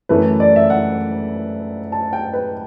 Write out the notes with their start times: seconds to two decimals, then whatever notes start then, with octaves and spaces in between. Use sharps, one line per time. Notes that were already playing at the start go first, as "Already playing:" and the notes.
0.09 F#2 E3 A3 B4
0.40 D5
0.56 E5
0.70 F#5
1.92 A5
2.13 G5
2.33 B4